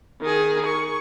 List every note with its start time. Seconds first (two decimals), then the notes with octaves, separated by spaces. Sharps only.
0.21 D#3 G#4
0.66 C#6